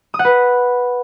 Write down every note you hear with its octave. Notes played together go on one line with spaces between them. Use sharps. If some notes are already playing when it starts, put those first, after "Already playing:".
D#6
F#5
B4